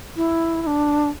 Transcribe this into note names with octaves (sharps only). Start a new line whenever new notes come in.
E4
E4
D4